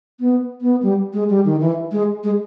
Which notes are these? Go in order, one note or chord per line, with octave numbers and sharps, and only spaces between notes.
B3
B3
G3
G#3
G3
D#3
E3
G#3
G#3